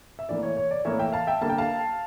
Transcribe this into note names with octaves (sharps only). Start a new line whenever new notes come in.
E5
A2 E3 A#3 D5
C#5
C#5
D5
A2 E3 A#3 C#5 E5
E5 G5
F5 A5
E5 G5
D3 G3 A#3 A5
G5
F5 A5